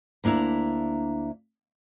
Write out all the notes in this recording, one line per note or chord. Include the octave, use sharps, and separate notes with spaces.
D2 A#3 D4 E4 A#5